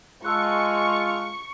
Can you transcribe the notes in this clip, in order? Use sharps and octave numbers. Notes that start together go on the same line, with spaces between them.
G#3 F4 A5 C#6 E6 F#6